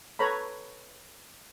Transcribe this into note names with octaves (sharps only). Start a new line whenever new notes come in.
A4 B4 C#5 A#5 B5